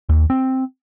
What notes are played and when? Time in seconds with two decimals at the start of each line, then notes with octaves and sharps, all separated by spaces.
0.09 D#2
0.30 C4